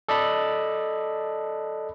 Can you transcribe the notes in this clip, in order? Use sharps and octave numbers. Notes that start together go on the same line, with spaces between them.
A4 D5 D#5 A5 B5